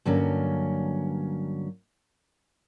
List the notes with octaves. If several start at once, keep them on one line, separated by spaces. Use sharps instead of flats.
G2 D3 F#3 A#3 C#4